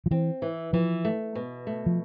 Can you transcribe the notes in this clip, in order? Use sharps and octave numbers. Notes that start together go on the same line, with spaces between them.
F3
E3 C4
E3
E3 F3
A3
B2
A3
F3